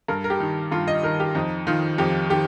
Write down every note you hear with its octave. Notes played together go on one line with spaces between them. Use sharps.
G2 A#4
A#4
G4
D#3
G2 F4
D#5
D#3 A#4
G4
F2 D#4
D#3 F4
F2 G4
D#3 G4